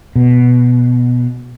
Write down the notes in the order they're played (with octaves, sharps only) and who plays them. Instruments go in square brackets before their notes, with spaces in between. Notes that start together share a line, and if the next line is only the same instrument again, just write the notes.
[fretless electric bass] B2